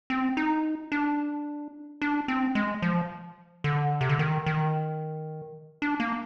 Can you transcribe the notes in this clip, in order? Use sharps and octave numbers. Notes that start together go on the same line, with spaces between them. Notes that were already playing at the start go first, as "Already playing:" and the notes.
C4
D#4
D4
D4
C4
G#3
F3
D3
C3
D3
D#3
D#3
D4
A#3